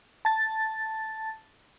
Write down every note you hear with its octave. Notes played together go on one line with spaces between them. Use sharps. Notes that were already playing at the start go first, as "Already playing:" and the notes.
A5 A6